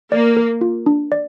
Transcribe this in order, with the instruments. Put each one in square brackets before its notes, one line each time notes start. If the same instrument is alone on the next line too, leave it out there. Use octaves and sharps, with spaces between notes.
[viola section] A#3 [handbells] D5
[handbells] A#4
F4
D4
D5